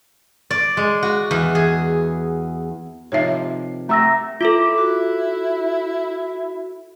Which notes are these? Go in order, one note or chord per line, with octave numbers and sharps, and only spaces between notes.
D5
G#3
F#4
E2
G#4
C3 D#3 F3 C#5 E5
A3 G4 E5 F#5 A#5 E6 A#6
E4 F4 A4 E5 D6
F#4